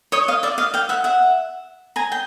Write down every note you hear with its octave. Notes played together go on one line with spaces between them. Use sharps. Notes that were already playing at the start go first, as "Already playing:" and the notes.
C#5 D#5
D#5 F5
D5 E5
D#5 F5
F5 G5
E5 F#5
E5 F#5
G#5 A#5
G5